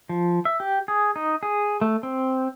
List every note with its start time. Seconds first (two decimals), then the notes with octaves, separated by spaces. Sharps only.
0.09 F3
0.45 E5
0.60 G4
0.88 G#4
1.16 D#4
1.43 G#4
1.81 A3
2.03 C4